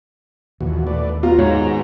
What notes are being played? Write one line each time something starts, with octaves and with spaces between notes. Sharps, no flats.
D#2 A#2 E3 F#4
A3 B4 D5
B3 F4 F#4 A#5
G#2 C#5